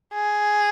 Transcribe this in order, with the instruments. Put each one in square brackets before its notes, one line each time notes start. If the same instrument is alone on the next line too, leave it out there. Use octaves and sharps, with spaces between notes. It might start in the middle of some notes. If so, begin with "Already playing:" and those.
[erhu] G#4